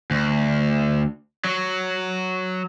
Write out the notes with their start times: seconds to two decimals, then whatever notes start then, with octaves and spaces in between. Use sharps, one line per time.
0.11 D2
1.45 F#3